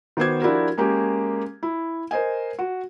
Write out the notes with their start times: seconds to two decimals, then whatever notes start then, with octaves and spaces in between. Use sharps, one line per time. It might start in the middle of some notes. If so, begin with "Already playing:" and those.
0.17 D#3 B3 F#4 C5 D6 G#6
0.42 F3 D4 E4 F#4 G4 A#4
0.78 G#3 A#3 C#4 G4
1.63 E4
2.11 A#4 C5 D#5 G#5
2.59 F#4